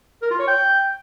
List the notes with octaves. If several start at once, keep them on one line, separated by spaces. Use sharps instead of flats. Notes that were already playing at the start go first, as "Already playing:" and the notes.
A#4
F4
C#5
G5